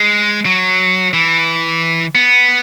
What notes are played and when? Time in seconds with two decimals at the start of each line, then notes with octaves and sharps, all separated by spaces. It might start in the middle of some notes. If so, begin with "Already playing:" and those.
Already playing: G#3
0.46 F#3
1.13 E3
2.15 B3